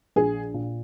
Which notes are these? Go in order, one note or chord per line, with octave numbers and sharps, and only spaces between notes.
A#1 G#4
A#2